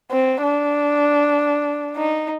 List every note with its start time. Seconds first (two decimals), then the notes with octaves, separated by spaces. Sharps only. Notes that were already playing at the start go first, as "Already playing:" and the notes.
0.11 C4
0.43 D4
1.97 D#4